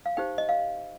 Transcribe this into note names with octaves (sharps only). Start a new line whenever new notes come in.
F5
D#4 G4 C5 G5
D#5
F5